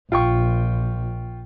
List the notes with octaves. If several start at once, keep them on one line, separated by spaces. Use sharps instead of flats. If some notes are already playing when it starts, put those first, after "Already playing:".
A#1 F4 G5 C#6